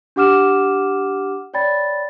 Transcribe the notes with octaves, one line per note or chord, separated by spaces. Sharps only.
D4 G4 F#5 D6 F6 E7
C#5 D5 G5 B5 A6